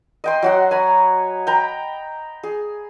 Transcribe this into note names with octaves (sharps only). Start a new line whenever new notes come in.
D#5 G5 C6
F#3 F#4 F#5
G#5 A#5 B5
G5 A#5 B5
G#4